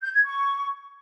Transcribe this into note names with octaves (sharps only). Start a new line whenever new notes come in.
G6
G#6
C#6